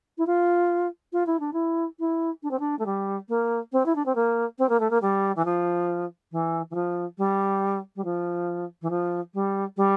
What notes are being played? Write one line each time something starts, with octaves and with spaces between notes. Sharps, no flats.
E4
F4
F4
E4
D4
E4
E4
D4
C4
D4
A3
G3
A#3
C4
E4
D4
C4
A#3
C4
A#3
A3
A#3
G3
E3
F3
E3
E3
F3
G3
G3
F3
E3
F3
G3
G3